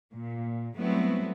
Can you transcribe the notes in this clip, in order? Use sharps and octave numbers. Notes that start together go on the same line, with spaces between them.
A#2
F#3 G3 A3 B3 C4 E4